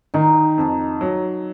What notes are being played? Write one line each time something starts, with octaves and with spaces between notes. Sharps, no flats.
D#3 D#4
F2
F#3